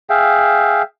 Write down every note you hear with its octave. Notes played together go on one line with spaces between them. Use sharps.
G#4 E5 F5 G5